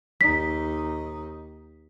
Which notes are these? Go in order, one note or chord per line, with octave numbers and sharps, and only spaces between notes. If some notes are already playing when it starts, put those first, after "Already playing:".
D#2 D#4 B6